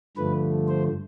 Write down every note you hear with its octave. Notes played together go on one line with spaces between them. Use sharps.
G2 D3 F3 A3 B4
C5